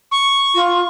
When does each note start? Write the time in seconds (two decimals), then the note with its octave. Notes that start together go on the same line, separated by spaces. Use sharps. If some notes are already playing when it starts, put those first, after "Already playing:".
0.11 C#6
0.54 F4